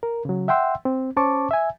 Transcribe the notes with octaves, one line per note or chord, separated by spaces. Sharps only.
A#4
C#3 F#3
E5 F#5 G5 C6 E6
C4
C#4 C5 A5 C#6 D6
E5 G#5